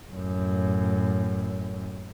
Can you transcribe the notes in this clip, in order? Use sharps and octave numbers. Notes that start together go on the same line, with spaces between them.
F#2 A2